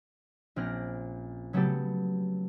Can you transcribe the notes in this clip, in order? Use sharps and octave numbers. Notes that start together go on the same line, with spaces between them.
A#1 C4 C#4 F6 F#6 A#6
C#3 F#3 A3 B3 G4 A4